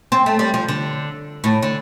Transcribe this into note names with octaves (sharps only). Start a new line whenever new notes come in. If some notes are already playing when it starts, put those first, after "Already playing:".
C4
A3
G3
F3
D3
A2
D3